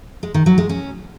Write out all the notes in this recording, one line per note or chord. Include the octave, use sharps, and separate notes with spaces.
G#3
D#3
F#3
G#3
C#4